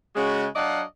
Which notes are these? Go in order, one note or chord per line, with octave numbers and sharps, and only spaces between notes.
C#3 G#3 F#4
F#3 D4 D5 D#5 F5 F#5